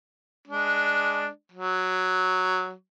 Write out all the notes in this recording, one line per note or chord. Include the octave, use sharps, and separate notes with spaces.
G#3 D4
F#3